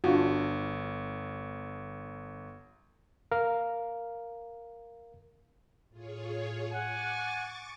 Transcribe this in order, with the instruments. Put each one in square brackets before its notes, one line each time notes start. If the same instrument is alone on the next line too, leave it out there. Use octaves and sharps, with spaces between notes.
[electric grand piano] G1 [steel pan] D4 F4 F#4
[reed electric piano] A#4 F5
[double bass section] A2 [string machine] F4 G#4 C#5
[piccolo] F#5 [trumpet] G#5 [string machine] C#6 D6 A6